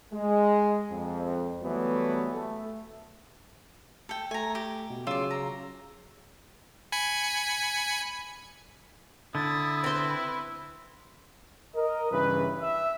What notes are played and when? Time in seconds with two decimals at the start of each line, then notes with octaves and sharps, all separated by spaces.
0.12 G#3
0.90 F2
1.63 E3 F#3 G3 A3 B3
2.32 A3
4.09 A4 G5
4.31 A3 G#5 A#5
4.55 G4
4.90 B2
5.07 C#3 F#3 F4 D5 E6
5.31 A#5
6.92 G#5 B5 C#7
9.35 D3 E4 D#6 A6
9.84 C4 B4 C5
11.75 A#4 D#5
12.11 G2 C#3 E3 B4
12.60 E5